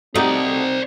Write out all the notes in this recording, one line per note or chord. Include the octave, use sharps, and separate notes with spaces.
A3 C4 D#4 F#4 G4 C5 D5